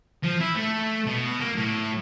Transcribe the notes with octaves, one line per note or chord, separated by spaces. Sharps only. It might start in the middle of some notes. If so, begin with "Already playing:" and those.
F3
E4
A3
B2
A#3
A2